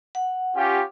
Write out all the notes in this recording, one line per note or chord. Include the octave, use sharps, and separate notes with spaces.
F#5
C#4 F4 G4